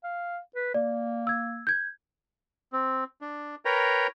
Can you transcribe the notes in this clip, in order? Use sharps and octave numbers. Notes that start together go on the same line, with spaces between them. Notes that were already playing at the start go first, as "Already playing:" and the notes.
F5
B4
A#3 D5
E6 G#6
G6 G#6
C4
D4
A#4 B4 C#5 G5 A#5